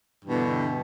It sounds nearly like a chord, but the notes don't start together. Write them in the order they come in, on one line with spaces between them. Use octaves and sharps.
G2 E3 B2 D3